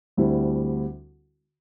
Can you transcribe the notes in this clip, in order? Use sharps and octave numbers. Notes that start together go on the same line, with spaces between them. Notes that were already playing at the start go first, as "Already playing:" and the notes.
D2 D3 G3 C4 E4